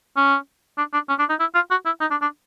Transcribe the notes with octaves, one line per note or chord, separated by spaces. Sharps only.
C#4
D4
D4
C#4
D4
D#4
E4
F4
F#4
E4
D#4
D4
D4